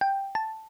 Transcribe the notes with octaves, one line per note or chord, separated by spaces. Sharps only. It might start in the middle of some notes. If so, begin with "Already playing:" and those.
G5
A5